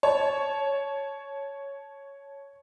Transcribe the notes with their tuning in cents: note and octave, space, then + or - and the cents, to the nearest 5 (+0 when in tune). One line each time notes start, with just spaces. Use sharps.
C#5 +0 A5 -25